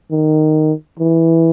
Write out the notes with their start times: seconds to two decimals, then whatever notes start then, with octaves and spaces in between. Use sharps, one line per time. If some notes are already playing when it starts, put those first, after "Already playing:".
0.11 D#3
1.00 E3